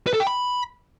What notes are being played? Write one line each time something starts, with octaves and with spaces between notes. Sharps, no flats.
B4
A4
G5
B5